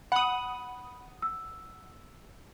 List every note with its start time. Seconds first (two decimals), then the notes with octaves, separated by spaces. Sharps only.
0.12 F#5 B5 D#6 F#7
1.22 E6